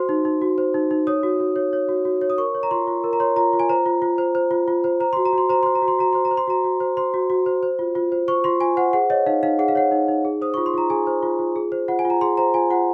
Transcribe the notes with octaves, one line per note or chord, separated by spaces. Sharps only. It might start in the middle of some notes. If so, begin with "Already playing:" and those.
Already playing: F#4 C5 C6
D#4
D#4
F#4
C5
D#4
D#4
C#5 D#6
F#4
F#4
C#5
C#5
F#4
F#4
C#5
D#6
A#4 C#6
C#5
A#5
F4 C6
F4
A#4
A#5
C#5 C6
F4 A#5
F4
G#5
C5 A#5
F4
F4
C5
C5
F4
F4
C5
C5 A#5
F#4 C6
A#5
F#4
C6
C5 A#5
C5 C6
A#5
F#4
C6
F#4 A#5
C5 C6
A#5
C5
C6
F#4 A#5
F#4
C5
C5 C6
F#4
F#4
C5
C5
F4
F4
C5
C5 C#6
F4 C6
F4 G#5
C5 F#5
G#4 F#5
C#5 D#5
D#4 F5
D#4 F5
G#4 F#5
F5
C#5 F#5
D#4
D#4
G#4
C5 D#6
F4 C#6
C6
F4 A#5
G#4 G#5
C5
F4
F4
G#4
C5
F4 F#5
G#5
F4
A#5
G#4 C6
C5 A#5
F4 G#5
F4 F#5